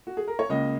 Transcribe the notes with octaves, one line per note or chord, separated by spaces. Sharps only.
F#4
G#4
A#4
C#5
C#2 C#3 A#3 D#5